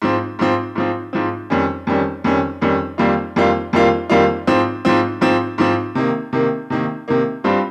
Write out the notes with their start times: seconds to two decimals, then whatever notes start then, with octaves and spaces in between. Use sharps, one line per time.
0.02 G#2 F3 C4
0.39 G#2 F3 C4
0.75 G#2 F3 C4
1.13 G#2 F3 C4
1.50 F2 D#3 G3 C#4
1.87 F2 D#3 G3 C#4
2.24 F2 D#3 G3 C#4
2.61 F2 D#3 G3 C#4
2.98 F2 D#3 G3 A#3 F4
3.36 F2 D#3 G3 A#3 F4
3.73 F2 D#3 G3 A#3 F4
4.10 F2 D#3 G3 A#3 F4
4.47 G#2 F3 C4
4.85 G#2 F3 C4
5.21 G#2 F3 C4
5.58 G#2 F3 C4
5.95 C3 D#3 A#3
6.33 C3 D#3 A#3
6.70 C3 D#3 A#3
7.08 C3 D#3 A#3
7.44 G2 G3 C4 F4